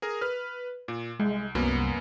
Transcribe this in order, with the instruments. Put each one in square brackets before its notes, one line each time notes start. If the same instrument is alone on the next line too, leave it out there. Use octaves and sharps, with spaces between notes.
[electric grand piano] G#4 A#4
B4 F6
A#2
[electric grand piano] C2 [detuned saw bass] G#3
[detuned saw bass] C2 [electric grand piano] F#2 A#3 B3